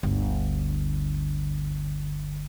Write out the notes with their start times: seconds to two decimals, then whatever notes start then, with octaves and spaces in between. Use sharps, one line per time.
0.03 G1 D2